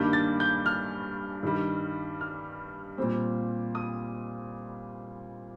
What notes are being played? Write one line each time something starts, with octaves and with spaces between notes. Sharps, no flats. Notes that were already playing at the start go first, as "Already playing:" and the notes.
Already playing: G2 D#3 G3 A#3 D4 G6
A6
G6
F6
G2 D#3 G3
F6
A#2 G3 C4
D#6